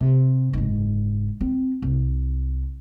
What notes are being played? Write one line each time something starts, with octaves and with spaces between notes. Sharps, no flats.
C3
F#1 G#2
C4
C2